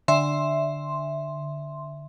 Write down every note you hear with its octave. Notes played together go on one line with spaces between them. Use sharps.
D3 E5 C6